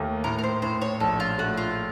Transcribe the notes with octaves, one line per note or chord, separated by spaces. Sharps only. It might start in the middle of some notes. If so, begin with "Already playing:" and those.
Already playing: D#2 A3 A#3
A2 A#4
A#4
C5
A2 C5
C#5
A#1 A4
F4
A3 F#4
F4